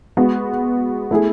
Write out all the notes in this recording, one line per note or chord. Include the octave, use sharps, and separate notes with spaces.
G#3 B3 F#4 B4
A3 E4 G#4